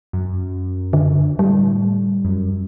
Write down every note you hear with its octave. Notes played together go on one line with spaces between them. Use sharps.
F#2
D3
A2 G3
F#2